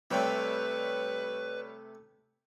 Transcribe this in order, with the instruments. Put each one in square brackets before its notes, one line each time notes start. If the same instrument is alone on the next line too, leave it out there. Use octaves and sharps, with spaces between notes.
[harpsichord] C3 A3 [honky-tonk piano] G3 C#5 G5 [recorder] B4